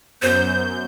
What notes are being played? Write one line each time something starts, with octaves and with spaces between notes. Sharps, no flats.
F#2 B3 C5 G6